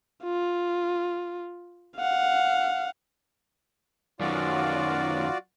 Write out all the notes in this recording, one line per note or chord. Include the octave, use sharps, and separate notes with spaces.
F4
F5 F#5
F#2 D#3 F4 F#4 D5